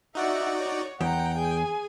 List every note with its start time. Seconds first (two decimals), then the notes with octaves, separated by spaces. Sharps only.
0.15 D#4 F#4 D5 E5 F#5
0.57 C#5
1.01 E2 F#5 G5 A#5
1.38 G#4 G#5